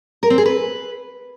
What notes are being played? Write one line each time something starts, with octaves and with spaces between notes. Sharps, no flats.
A#4
C4
G#4
B4